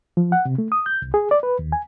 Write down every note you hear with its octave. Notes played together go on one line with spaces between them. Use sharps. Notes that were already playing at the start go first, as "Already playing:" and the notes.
F3
F#5
C3
A3
D#6
G6
C2
G#4
D5
B4
D#2
G#5